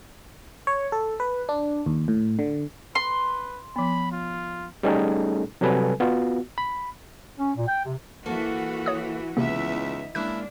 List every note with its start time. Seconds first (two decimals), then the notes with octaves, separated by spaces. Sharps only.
0.67 C#5
0.92 A4
1.20 B4
1.49 D4
1.86 D#2
2.08 A2
2.39 D3
2.95 B4 C6
3.76 F3 B3 B5
4.12 F4
4.83 G3 A3 C#4 D#4 G#4 A4
5.61 C3 F#3 G3 A4 B4 G#5
6.00 B3 F4 F#4
6.58 B5
7.37 C#4
7.56 A#2
7.68 G5
7.85 C3
8.26 E3 A#3 F#4 A4
8.86 C#5 D#6
9.37 C#2 C3 E3 A#3 B3 E5
9.72 D#4
10.15 G#3 A#3 C#4 D4 E4 F#6